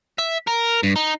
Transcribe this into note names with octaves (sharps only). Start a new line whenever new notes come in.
E5
A#4
G2
D#4